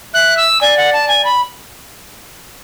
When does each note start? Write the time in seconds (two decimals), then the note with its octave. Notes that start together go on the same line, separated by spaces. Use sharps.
0.14 E5 F#6
0.37 E6
0.61 D5 G#5
0.77 F#5
0.93 A5
1.08 G#5
1.25 B5